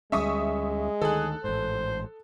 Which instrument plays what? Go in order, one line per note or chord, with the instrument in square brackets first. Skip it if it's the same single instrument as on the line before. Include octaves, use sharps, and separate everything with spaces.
[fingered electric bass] D2 G3 C#4 [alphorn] G#3 [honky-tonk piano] E5 C#6 D#6
[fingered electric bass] D2 D#3 [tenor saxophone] G#4 [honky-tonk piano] A4 F#6
[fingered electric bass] A1 G#2 [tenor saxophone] C5